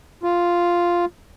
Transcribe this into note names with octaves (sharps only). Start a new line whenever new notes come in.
F4